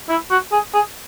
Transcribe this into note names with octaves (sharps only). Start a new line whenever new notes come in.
E4
F#4
G#4
G#4